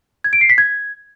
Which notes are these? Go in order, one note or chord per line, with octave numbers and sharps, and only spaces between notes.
G#6
D7
C7
B6
G#6